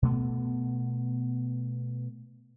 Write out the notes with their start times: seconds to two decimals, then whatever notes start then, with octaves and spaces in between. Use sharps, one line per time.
0.02 B2 A3 B3